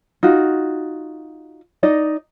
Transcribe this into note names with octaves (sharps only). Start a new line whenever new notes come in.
D#4 F4 F#4
D#4 D5 D#5